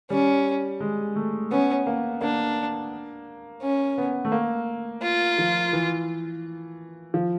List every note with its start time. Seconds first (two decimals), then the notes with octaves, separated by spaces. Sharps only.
0.10 G3 C#4
0.80 G#3
1.16 A3
1.51 B3 C#4
1.87 A#3
2.21 A#3 D4
3.62 C#4
3.98 B3
4.25 A3
4.32 A#3
5.03 F4
5.38 F3
5.73 E3
7.14 F3